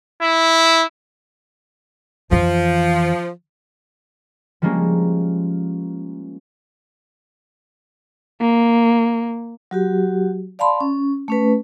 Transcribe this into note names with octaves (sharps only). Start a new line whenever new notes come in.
E4
F2 E3 F3
F3 G3 G#3 A#3 C#4
A#3
F#3 F#4 G4
D5 F5 A5 B5 C6
C#4
A3 C#4 B4